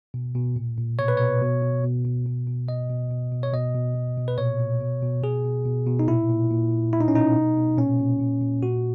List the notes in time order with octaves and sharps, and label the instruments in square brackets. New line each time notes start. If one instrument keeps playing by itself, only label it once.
[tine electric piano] B2
B2
A#2
A#2
B2 C#5
B4
B2 C#5
B2
B2
B2
B2
B2
B2
B2 D#5
B2
B2
B2
C#5
B2 D#5
B2
B2
B2
B4
A#2 C#5
A#2
B2
B2
B2 G#4
B2
B2
B2
D#4
A#2 E4
A#2
A#2
A#2
B2 E4
D#4
C#4
B2 D#4
B2
B2
A#2 C#4
A#2
A#2
A#2
A#2 F#4